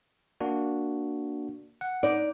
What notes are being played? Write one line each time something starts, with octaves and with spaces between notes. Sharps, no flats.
A#3 D4 F#4
F#5
D#4 D5